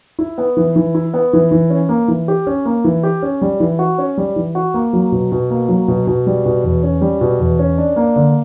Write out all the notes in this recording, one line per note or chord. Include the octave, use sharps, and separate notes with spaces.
E4
B3
E3
E3
E4
B3
E3
E3
C#4
A#3
E3
G4
C#4
A#3
E3
G4
C#4
G3
E3
F#4
C#4
G3
E3
F#4
A#3
F#3
B2
B2
A#3
F#3
B2
B2
G3
B2
E2
C#4
G3
B2
E2
C#4
D4
A#3
D3